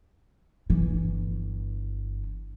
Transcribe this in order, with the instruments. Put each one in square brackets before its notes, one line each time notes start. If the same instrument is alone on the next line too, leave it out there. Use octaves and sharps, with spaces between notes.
[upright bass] G1 E3